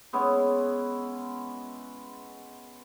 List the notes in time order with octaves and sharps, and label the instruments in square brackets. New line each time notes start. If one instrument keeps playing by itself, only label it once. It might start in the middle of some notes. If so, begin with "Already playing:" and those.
[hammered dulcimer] G#3 B3 C#4 E4